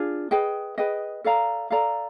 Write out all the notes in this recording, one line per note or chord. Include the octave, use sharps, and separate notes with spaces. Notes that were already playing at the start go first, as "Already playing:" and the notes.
Already playing: D4 F4 G#4
G#4 B4 D#5 G5
G#4 B4 D#5 G5
A4 D5 F5 A#5
A4 D5 F5 A#5